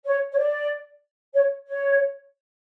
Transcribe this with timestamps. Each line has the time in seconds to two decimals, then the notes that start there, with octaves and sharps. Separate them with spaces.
0.04 C#5
0.31 C#5
0.37 D5
1.33 C#5
1.66 C#5